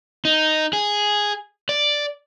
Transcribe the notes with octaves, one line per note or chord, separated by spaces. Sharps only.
D#4
G#4
D5